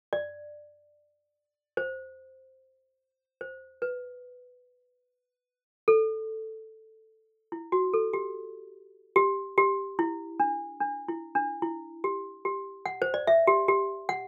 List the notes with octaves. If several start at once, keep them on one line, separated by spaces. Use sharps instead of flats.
D5
C5
C5
B4
A4
E4
F#4
A4
G4
G4
G4
E4
D4
D4
E4
D4
E4
G4
G4
F#5
C5
D5
E5
G4
G4
F#5